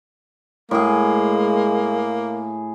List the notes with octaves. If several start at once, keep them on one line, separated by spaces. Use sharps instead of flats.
A2 G#3 A#3 G#4